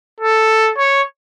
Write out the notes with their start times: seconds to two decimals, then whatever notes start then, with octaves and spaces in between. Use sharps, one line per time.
0.20 A4
0.78 C#5